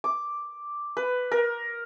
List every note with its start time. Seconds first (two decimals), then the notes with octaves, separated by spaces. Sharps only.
0.04 D6
0.97 B4
1.32 A#4